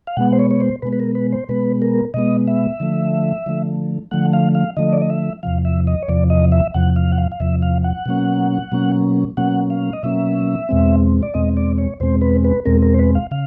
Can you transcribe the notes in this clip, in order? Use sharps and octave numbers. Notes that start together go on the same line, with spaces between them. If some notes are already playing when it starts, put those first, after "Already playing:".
F5
B2 G#3 B3 F#5
C5
C#5
C#5
C5
B2 G#3 B3 B4
B4
A#4
B4
C5
B2 G#3 B3 B4
A#4
B2 G#3 B3 D#5
E5
D3 F3 A3
D3 F3 A3
D3 F3 A3 F#5
F5
F5
D3 F3 A3 D#5
D5
D#5
E5
E2 C3 F3 F5
E5
D#5
C#5
E2 C3 F3 D5
D#5
E5
E2 C3 F3 F#5
F5
F#5
F5
F5
E2 C3 F3 E5
F5
F#5
B2 F#3 A#3 C#4
B2 F#3 A#3 C#4
B2 F#3 A#3 C#4 F#5
F5
D#5
B2 F#3 A#3 C#4 E5
E2 B2 G#3 C4
D5
E2 B2 G#3 C4 D#5
D5
C#5
E2 B2 G#3 C4 C5
B4
B4
E2 B2 G#3 C4 A#4
A#4
C5
B4
F5
C#3 F5